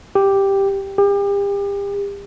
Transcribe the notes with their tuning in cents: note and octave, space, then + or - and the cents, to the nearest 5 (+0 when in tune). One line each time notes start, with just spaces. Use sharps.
G4 +0
G4 +35